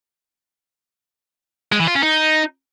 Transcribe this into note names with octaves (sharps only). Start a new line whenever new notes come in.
G#3
E3
F4
C#4
D#4